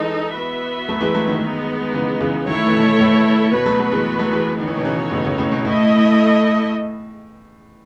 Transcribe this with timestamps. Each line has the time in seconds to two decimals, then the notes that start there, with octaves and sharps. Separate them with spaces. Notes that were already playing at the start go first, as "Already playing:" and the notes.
Already playing: E3 G#3 D#4 A4 D#5
0.35 B3 F#4 B4 E5
0.89 F#3 A3
1.01 E3 G#3
1.14 F#3 A3
1.27 D#3 F#3
1.41 G#3 B3 D#4
1.93 C#3 E3
2.21 C#3 E3
2.46 D#3 F#3 A3 E4 A4 C#5
2.67 E3
2.73 B2 D#3
3.00 A2
3.52 B2 B3 F#4 B4
3.66 F#3 A3
3.79 F#3 A3
3.92 E3 G#3
4.19 F#3 A3
4.32 E3 G#3
4.58 D#3 B3 D#4 F#4 A4 C#5
4.68 E3
4.76 B2 D#3
4.85 C#3 E3
5.11 A2 C#3
5.25 A2 C#3
5.38 A2 C#3
5.52 B2
5.65 A2 A3 E4 A4 D#5